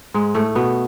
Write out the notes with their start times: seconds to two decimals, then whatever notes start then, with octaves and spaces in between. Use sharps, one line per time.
0.14 G#2 G#3
0.35 A2 A3
0.55 B2 B3